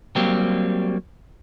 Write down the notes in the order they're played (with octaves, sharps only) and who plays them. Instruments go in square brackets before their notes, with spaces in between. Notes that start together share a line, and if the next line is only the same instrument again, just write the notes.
[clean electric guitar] F#3 G3 A#3 C4 G4